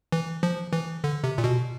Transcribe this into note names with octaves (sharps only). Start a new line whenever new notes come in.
E3
F3
E3
D3
C3
A#2
B2